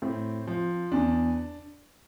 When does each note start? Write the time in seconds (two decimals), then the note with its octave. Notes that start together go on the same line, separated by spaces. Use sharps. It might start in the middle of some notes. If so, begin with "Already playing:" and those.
0.02 A2 C4
0.47 F3
0.92 E2 D4